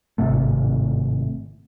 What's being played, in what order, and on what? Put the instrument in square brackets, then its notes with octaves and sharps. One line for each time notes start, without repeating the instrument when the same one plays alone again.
[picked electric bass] G#1 A2 C3 A3